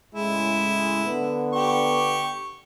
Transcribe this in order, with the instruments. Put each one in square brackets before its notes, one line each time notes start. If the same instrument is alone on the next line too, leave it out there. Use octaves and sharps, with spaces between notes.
[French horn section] A2 C#3 G#3 [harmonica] E4
[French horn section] D3 B3
[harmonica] G4 C#6